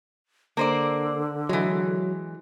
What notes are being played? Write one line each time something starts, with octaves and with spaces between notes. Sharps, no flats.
D3 A#3 C5 D5
E3 F#3 G#3